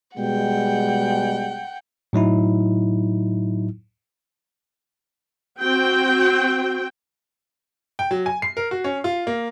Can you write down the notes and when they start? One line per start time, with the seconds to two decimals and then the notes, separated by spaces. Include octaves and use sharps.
0.17 B2 G3 G#3 F#5 G5
2.13 A2 F#3 D#4 E4
5.59 C4 F#4 G5
7.99 G5
8.11 F#3
8.26 G#5
8.42 C7
8.57 A#4
8.71 F#4
8.84 C#4
9.04 F4
9.27 A#3